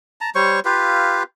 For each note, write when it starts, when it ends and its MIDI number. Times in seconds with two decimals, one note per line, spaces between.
0.21 0.30 81
0.21 0.30 82
0.35 0.60 55
0.35 0.60 72
0.35 0.60 73
0.35 0.60 85
0.65 1.23 65
0.65 1.23 67
0.65 1.23 71
0.65 1.23 77